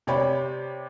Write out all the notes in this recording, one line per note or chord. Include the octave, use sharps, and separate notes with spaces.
C3 C#5 D5 G5 B5